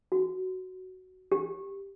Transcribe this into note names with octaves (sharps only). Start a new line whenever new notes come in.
F#4
G4